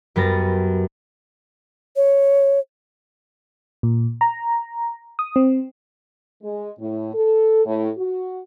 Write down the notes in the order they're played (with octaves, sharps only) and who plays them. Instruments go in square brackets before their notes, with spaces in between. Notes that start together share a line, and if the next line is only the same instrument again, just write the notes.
[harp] F#2 G3 B3 A6 A#6
[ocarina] C#5
[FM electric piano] A#2
A#5
D#6
C4
[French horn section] G#3
A2
A4
A2
F#4